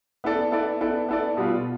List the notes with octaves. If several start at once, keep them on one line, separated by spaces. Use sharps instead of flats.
B3 E4 A4 D5
B3 E4 A4 D5
B3 E4 A4 D5
B3 E4 A4 D5
B2 G3 B3 F4